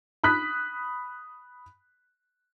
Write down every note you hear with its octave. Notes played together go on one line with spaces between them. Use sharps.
B5 D#6 F#6 B6